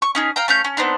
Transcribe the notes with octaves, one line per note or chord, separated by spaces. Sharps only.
C#6
C#4 D#4 G#4
F5 G5 A#5
A3 C#4 F5 G6
C#4
B3 C4 D4 D#4